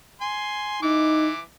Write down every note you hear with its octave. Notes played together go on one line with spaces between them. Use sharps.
G#5 C6
E3 D#4 D6